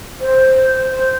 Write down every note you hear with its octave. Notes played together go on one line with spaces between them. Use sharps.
C5